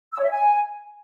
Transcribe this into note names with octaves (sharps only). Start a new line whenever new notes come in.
E6
C#5
E5
G#5